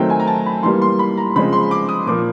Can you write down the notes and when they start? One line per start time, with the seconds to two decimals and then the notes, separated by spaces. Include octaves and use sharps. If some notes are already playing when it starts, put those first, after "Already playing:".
Already playing: D#3 F#3 A3 C4 G5
0.10 G#5
0.20 A#5
0.27 A5
0.46 B5
0.63 E3 G3 A#3 C6
0.82 C6
0.99 B5
1.17 A#5
1.36 C#3 F3 G#3 C4 B5
1.53 C6
1.71 D6
1.89 D#6
2.06 A#2 F3 A#3 D6